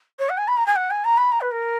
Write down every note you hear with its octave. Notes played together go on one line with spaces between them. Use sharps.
C#5
F#5
G#5
B5
A#5
G#5
F#5
G#5
A#5
B5
A#5
B4
A#4